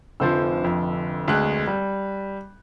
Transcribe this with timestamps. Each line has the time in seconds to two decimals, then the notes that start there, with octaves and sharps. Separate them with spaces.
0.20 F1 D3 F3 C5 E6
0.64 F2
1.28 D2 G#3 F#6
1.67 G3